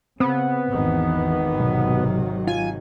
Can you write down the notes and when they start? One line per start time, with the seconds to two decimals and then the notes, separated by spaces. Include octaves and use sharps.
0.20 C#3 B3 C4
0.72 G#1 E2 G#2 D#3 E3
1.60 B1 C3 F#3
2.47 F4 G#5